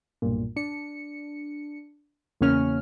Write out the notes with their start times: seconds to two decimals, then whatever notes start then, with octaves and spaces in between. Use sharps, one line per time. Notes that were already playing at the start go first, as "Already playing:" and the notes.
0.22 B1 G2 A#2
0.56 D4 C#7
2.41 E2 C#3 A#3 C#4 F6